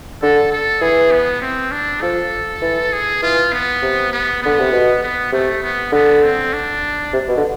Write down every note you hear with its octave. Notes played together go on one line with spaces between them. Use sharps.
D3 A4
A4
E3 G#4
B3
C4
D4
F3 A4
E3
G#4
E3 F4
B3
C3
B3
D3 B3
C3
B2
B3
C3 A3
B3
D3 B3
C4
D4
C3
B2
D3